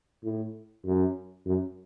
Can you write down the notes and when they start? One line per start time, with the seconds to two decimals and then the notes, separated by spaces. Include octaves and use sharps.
0.24 A2
0.86 F#2
1.46 F#2